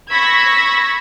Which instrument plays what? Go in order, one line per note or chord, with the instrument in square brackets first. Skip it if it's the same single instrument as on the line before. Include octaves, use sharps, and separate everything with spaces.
[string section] B5 C#6 E6 G#6 A#6 B6